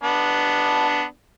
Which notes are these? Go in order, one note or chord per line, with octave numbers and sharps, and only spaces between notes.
B3 D4